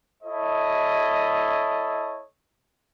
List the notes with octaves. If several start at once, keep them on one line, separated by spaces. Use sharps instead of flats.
E4 A4 C#5 D#5